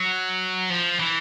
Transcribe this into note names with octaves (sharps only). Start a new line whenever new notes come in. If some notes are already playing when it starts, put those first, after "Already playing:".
Already playing: F#3
F3
E3